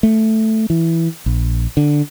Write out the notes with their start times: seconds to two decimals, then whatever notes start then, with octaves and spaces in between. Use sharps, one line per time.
0.03 A3
0.70 E3
1.26 A#1
1.77 D3